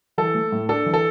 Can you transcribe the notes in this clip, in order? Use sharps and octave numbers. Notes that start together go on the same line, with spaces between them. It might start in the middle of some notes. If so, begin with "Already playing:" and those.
E3 A4
A3
A2
D4 A4
E3
A4